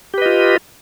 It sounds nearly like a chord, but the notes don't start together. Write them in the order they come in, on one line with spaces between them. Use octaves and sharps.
G4 B4 D#5 F4